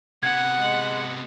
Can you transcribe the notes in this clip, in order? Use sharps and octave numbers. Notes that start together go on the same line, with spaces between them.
C3 B3 F#5 G#6
G#3